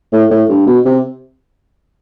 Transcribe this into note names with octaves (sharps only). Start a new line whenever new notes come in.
A2
A2
G2
B2
C3